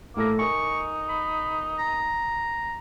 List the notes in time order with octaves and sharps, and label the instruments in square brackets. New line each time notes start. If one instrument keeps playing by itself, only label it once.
[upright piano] A2 A4 A#6 [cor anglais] A#3
[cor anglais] D#4 [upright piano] A#4 G#5 [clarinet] C#6
[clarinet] B5
A#5